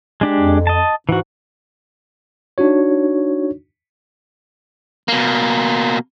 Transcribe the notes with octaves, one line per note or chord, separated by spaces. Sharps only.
G#3 D4 G4
F2
D#5 A5
G#2 E3 F#4
D4 D#4 F#4 C#5
B2 A#3